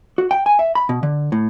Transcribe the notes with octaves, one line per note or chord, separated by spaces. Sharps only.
F#4
G5
G#5
E5
B5
B2
D3
A2